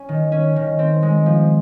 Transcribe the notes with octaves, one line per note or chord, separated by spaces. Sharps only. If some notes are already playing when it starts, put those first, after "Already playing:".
Already playing: C#4
D#3
C#4
D#3
C4
G#3
F3